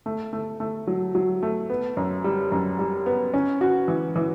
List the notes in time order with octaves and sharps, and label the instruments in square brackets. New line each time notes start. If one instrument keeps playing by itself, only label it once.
[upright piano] A3
A3
A3
F#3
F#3
A3
B3
F#2
G3
F#2
G3
B3
C#4
F#4
E3
E3